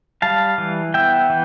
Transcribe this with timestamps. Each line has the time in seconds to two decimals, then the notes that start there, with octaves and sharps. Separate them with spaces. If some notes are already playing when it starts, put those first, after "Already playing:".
0.22 G3 F5 A5
0.58 E3
0.94 B3 E5 G5
1.30 E3